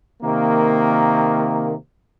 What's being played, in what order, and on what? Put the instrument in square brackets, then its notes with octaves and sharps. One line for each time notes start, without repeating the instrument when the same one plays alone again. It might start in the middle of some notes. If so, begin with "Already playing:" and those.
[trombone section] C3 D#3 A#3